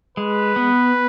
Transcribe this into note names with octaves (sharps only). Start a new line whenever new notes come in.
G#3 B4
B3